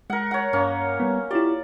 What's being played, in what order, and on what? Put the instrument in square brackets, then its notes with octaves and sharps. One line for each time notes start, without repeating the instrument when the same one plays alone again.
[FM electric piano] G#3 [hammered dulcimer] A#4 F#5
[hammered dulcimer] C#5 F#5
[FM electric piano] G2 [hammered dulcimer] A#3 C#4
[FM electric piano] G3 B3
[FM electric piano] E4 F4 G4 [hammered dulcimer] D5